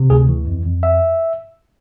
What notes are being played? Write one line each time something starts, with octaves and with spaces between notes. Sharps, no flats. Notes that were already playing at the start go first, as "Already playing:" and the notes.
Already playing: C3
D2 G#4
E3
F2
F2
E5